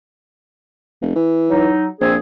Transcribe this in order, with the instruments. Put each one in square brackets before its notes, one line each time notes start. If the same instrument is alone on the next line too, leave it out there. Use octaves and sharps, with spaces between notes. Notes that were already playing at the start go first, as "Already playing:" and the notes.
[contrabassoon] F1
E3
[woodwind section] F#3 D#4
[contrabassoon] A#1 [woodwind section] C4 G#4